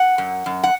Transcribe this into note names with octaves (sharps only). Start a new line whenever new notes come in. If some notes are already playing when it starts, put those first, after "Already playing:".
Already playing: F#5
F#2
F#2
F#5